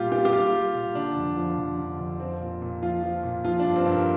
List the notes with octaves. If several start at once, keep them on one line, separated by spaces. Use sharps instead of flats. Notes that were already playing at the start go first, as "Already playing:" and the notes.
Already playing: A#2 G3 F4 G4
A#2 G4
G4
G3 F4
G3
A#2
D3 D4
F2
F3
F2
D3
F2
F3 C4
A#2
A#2
F3 F4
F3
A#2
F3 F4
D4
G2
C4
G2
A#3